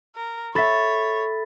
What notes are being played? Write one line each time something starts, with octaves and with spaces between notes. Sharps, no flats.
A#4
A4 C#5 E5 B5 A6 B6